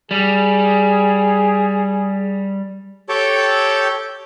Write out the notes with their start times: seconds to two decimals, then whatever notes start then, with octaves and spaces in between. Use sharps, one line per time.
0.11 G3 G#4
3.09 G4 A4 C#5 G5 A5